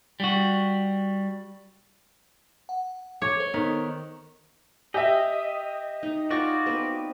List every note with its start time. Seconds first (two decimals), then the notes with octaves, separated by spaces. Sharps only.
0.20 G3 F#4
2.69 F#5
3.22 C#5 D6
3.40 C5
3.54 D#3 B3
4.94 G4 D#5 E5
6.03 D#4
6.31 D#4 F4 F#4 D5 C#6
6.66 B3 C4 B4